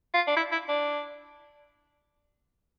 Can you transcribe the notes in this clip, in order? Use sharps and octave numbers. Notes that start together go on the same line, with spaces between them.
F4
D4
E4
E4
D4